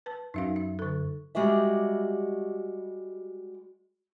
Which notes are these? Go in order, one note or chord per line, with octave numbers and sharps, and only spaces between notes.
B4 A5
F#2 D#4 E5 F5
E5
D3 A4
G3 G#3 F#4 G4 E5